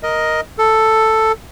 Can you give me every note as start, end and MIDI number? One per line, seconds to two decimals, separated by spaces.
0.03 0.41 70
0.03 0.41 75
0.58 1.32 69